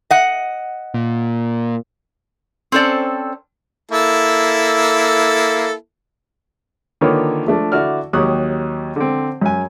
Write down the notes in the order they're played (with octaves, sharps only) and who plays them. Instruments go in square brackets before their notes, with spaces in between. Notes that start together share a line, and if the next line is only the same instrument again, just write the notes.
[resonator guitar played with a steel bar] D#5 F#5
[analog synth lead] A#2
[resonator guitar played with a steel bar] C4 C#4 A4 C5 D5
[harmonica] A#3 E4 A4
[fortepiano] D3 D#3 A#3 F4 B4 C#5
F3 A3 D4
D3 E4 F#4 D5 F6
D#2 F#3 G4 C#6 D#6 F#6
D3 C4
F#2 G#5